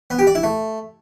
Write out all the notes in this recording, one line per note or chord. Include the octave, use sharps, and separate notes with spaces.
B3
G4
D5
E4
A3